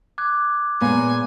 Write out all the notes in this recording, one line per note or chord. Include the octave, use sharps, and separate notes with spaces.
D6 F#6 G#6
A#2 G#3 A#3 B3 G#5